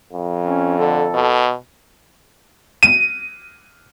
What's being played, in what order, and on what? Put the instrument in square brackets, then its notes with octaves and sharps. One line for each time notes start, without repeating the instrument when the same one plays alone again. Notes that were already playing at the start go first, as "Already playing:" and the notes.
[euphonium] F2
[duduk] C#4
[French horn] D3 [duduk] A4
[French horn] B2
[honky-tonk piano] D#7